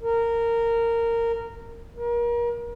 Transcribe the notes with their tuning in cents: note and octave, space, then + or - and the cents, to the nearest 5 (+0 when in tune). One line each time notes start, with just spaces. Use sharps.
A#4 -15
A#4 +30